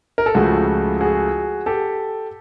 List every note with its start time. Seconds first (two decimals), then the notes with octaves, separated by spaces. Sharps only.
0.18 A#4
0.26 A4
0.35 C#2 C#3 F3 A3 F#4 G#4
1.01 F#4 G#4
1.66 G4 A4